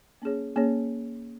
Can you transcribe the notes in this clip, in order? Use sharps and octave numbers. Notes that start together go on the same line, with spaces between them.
A#3 C#4 G#4 C#5
A#3 C#4 G#4 C#5